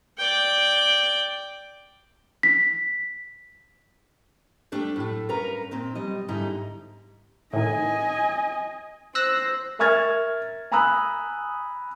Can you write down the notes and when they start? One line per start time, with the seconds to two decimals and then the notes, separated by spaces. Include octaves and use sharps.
0.18 D5 G5
2.43 B6
4.72 G3 A3 D4 G4
4.96 A2 A3
5.29 G2 C#4 A#4 B4 A#5
5.71 A#2 C4 D#4
5.95 B2 G3 D#5
6.28 G#2 D3 G3 D#4 E4
7.53 A2 D#3 D#5 G#5
9.15 C5 E6 F#6 A#6
9.79 A#4 E5 C#6 F6 G#6 A6
10.72 G#5 A#5 B5 D#6 E6 F#6